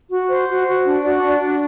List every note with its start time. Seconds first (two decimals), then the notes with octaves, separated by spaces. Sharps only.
0.10 F#4
0.28 C5
0.48 F#4
0.67 F#4
0.85 D4
1.03 F#4 D5
1.21 D4
1.28 D5
1.40 F#4